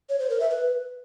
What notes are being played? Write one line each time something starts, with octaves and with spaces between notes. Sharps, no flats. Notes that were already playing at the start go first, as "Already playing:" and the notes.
C#5
C5
A#4
E5
B4